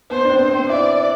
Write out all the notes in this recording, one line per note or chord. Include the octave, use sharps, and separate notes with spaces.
B3 C5
D4
C4
C4
E4 D5